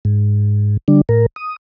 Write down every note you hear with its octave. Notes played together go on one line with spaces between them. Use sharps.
G#2
D3 G3 D4
A2 A#4
D#6